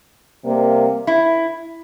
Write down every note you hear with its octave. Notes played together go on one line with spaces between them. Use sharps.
C3 G3 A#3
E4